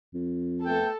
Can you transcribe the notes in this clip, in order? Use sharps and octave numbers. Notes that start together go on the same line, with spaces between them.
F2
A3 B3 A4 G5